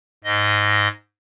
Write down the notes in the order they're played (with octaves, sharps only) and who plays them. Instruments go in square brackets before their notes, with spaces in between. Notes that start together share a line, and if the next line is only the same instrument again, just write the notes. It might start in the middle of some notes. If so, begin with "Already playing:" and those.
[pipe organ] G#2 D#5